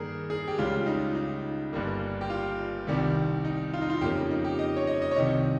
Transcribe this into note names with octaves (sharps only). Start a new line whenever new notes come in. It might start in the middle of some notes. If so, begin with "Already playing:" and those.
Already playing: G2 D#3 A#3 G#4 A#4
G#4
G4
C#2 C#3 G3 F4
D#4
D#4
G1 G2 G3 A#3
G4
F4
C2 C3 D#3 G3
D#4
F4
D#4
F4
F2 C#3 F3 A#3 G4
D#4
G4
D#5
C#5
D#5
D#5
C#5
C2 C3 D#3 D#5